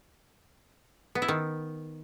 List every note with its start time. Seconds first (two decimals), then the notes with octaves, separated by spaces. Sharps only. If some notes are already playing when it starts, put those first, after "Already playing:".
1.15 B3
1.22 E4
1.28 D#3